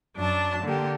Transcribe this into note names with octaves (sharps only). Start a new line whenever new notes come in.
F#2 D4 A5
D3 A#3 G4